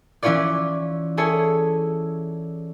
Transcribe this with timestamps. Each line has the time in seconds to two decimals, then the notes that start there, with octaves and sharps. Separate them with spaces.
0.23 E3 C#4 E4 F4 C#5 D5
1.17 E4 G#4 A4 C#5